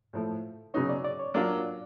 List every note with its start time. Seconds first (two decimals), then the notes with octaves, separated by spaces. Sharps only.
0.13 A2 F3 A3
0.74 C#3 F#3 B3 D#4 F#4 C#5
0.89 D5
1.05 D5
1.19 C#5
1.34 F#3 A#3 D4 F4 D5